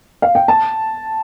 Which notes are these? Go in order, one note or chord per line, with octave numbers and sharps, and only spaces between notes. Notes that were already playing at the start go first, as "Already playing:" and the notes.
F5
G5
A5